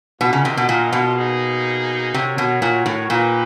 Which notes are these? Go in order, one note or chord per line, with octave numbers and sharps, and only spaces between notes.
B2 A#3 D4 F4 A#4 D#5
C#3
C3
B2
A#2
B2
A#3 D#4 G#4
C3 F#4 A#4 C#5 F#5
B2
A#2
A2
A#2 A#3 D#4 G4 B4